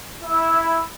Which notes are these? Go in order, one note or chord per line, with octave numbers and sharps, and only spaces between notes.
E4